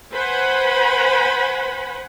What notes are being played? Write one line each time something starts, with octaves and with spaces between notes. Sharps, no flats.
B4 C5 F#5 G#5 B5